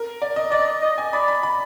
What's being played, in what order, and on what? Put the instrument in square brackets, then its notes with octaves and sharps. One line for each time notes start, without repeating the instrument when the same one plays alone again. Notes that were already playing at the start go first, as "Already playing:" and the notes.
Already playing: [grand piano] A#4
D5
D#5
[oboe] D5 [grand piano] D#5
[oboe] D#5
[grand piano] G#5
[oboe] D5 [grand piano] B5
[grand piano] B5
B5